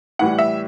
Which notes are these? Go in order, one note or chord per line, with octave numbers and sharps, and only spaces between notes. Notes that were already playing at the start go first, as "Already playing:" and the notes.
A2 E3 G3 F#5
E5